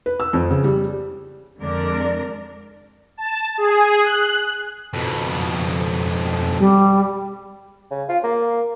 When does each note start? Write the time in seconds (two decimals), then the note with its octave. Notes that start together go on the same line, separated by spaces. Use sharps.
0.06 B4
0.20 E6
0.33 F2
0.51 C#3
0.64 G3
1.60 F2 D3 G#3 D4 A#4 D5
3.17 A5
3.58 G#4
4.02 F#6
4.94 F2 B2
6.58 G3
7.91 C#3
8.09 F4
8.24 A#3